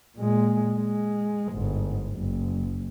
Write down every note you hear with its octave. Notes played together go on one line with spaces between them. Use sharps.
A#2 G#3
G#3
G1 G#2
F#1